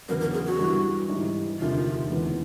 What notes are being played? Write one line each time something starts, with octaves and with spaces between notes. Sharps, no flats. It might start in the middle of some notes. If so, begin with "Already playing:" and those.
E2 C#3 F#3 B3 D4 A#4
A#4
G#4
F#4
G2 E3 G3
G#2 E3 G3
E1 D2 C3 D#3 F4
E2 C#3 E3 G#3 B3